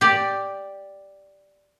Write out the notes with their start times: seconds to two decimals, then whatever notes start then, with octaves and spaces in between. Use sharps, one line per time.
0.01 G4 D5